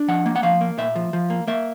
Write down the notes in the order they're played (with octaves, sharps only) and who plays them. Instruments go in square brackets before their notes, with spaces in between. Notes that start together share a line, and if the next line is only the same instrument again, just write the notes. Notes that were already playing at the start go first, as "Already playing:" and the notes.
Already playing: [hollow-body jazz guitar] D4
F3 F#5
A#3
F#5
F3 F5
A#3
A#2 E5
F3
F3
A#3
A#3 E5